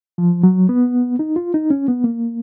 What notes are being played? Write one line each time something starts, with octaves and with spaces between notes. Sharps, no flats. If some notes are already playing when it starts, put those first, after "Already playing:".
F3
F#3
B3
D#4
F4
D#4
C#4
B3
A#3